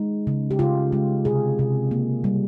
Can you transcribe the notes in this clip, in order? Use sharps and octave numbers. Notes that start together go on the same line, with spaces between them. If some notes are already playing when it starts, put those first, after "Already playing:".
Already playing: G#3 D#4
C#3
G4
C#3 F4
G#3
C3 G#4
C3
A#3
G3